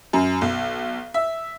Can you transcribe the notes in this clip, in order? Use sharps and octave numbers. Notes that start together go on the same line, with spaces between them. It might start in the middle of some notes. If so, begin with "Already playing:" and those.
F#2
B1
E5